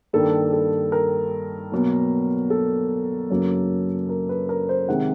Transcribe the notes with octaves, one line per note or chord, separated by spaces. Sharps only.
G2 D#3 G3 A#3 A4
A4
A#4
B2 F#3 A#3
A4
F#2 C#3 F#3 A#3
A#4
B4
A#4
C5
C3 D#3 G#3 F#5